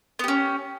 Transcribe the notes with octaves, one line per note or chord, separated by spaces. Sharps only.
B3 C#4 G4